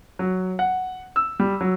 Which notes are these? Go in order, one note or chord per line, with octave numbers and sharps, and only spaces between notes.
F#3
F#5
E6
G3
F#3